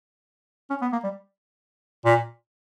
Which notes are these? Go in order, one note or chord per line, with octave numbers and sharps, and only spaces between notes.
C#4
B3
A#3
G3
A#2